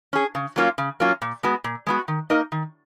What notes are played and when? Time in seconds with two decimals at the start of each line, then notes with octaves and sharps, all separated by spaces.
0.13 C#4 G#4
0.35 C#3
0.56 F#3 A#3 C#4 F4
0.78 C#3
1.00 F#3 A#3 C#4 F4
1.22 A#2
1.43 G#3 B3 F#4
1.64 A#2
1.87 G#3 B3 F#4
2.08 D#3
2.30 A#3 D#4 A#4 D#5
2.52 D#3